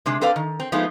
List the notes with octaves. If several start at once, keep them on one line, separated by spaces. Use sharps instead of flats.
C3 G#3 D4
C4 A4 B4 D5 F5
D#3
C4
F3 G#3 A3 B3 D#4 F4